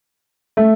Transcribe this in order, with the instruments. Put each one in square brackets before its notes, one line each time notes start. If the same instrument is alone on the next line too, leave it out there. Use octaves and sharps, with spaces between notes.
[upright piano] A3